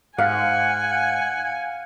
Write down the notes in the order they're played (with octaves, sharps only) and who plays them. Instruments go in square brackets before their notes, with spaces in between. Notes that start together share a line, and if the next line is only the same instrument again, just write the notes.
[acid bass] G#2 [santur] F5 [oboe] F#5 [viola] G#5